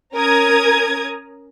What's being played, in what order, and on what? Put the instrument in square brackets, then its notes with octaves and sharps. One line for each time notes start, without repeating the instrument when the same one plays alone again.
[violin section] C#4 A#4 A#5 D#6 G#6